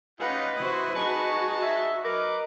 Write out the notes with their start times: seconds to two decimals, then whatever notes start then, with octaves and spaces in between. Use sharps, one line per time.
0.20 C#4 D#4 F4 G4 B4 D#5 F#5
0.56 C3 E4 F#4 C5 D#6
0.95 D#4 F#4 G#4 D#5 A5 C#6
1.62 E5
2.04 A#4 B4 D#5 D6